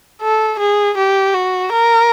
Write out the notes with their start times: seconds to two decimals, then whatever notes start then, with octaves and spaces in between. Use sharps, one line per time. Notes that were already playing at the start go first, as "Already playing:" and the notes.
0.22 A4
0.59 G#4
0.97 G4
1.35 F#4
1.72 A#4